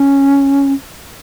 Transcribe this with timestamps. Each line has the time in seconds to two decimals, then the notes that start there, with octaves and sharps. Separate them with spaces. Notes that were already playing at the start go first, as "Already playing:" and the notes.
Already playing: C#4